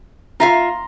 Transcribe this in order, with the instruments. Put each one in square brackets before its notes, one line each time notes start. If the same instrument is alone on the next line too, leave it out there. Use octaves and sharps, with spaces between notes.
[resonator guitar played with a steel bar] F4 E5 F5 [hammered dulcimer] A#5 C6